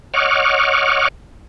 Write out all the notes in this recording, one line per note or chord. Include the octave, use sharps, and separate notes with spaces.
C#5 D#5 F#5 C#6 D6 F6